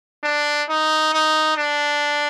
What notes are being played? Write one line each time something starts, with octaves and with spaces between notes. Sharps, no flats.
D4
D#4
D#4
D4